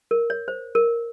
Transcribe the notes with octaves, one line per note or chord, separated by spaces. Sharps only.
A#4
C#5
C5
A#4